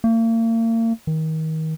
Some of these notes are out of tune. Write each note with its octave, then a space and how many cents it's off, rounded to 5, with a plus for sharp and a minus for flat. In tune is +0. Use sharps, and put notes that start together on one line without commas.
A#3 -40
D#3 +30